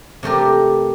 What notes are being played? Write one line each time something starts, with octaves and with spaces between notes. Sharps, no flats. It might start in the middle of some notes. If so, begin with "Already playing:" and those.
C3 A3 G4 A#4